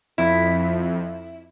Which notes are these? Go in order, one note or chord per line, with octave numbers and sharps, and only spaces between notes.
F2 E4